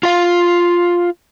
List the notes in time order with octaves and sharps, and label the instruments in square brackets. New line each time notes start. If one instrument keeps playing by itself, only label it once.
[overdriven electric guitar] F4 F5